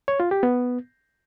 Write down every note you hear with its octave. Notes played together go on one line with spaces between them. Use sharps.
C#5
F4
G4
B3